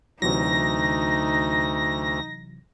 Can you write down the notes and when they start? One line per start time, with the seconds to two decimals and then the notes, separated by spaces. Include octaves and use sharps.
0.22 D2 C3 E3 F#3 D#4 A#6